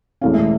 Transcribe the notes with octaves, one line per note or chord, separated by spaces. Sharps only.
E1 E2 E3 A3 C#4 F5
E5